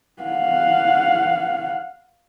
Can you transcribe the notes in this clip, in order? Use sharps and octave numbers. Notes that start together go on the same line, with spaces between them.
F5 F#5